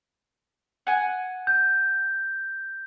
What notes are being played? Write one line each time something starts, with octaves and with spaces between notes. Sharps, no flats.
F#5 G#5
G6